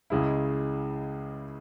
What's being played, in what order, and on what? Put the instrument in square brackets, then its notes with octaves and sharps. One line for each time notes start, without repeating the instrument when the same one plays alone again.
[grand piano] C#2 C#3 G#3 E4